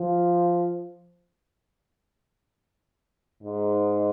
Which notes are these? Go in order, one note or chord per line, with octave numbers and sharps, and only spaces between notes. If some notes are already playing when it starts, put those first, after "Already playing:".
Already playing: F3
G#2